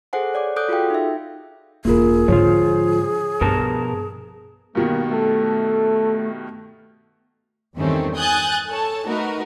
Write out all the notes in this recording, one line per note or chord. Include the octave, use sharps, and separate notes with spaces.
G#4 A4 C5 F#5 G#5
C#5 D5 F#5 D6
A4 D6 D#6 F#6 G6 D7
F4 F#4 G#4 A4 F5 G5
D#4 E5
E1 E2 A#3 F4 G#4 A#4
G#2 D3 F3 F4 C#5
G2 B2 F3 A#4 A5
G2 B2 D#3 A#3
A3 A4
E2 G2 D#3 A3 C4 C#4
G#5 D#6 F#6 G6 A6
A4 C#5 A5
A3 D#4 F#4 A#4 B4